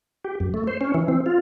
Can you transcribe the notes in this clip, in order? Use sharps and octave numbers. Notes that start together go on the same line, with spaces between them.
G4
F#2
A3
C5
C#4
E3
C4
F4